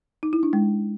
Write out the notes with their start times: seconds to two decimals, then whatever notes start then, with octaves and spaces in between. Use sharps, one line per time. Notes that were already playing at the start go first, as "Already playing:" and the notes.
0.23 D#4
0.33 E4
0.43 D4
0.53 G#3